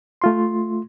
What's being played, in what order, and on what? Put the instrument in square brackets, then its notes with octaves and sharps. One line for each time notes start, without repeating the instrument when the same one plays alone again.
[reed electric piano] A3 F4 C6